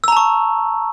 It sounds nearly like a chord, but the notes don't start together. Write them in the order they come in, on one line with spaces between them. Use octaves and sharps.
E6 A#5 A5 C#6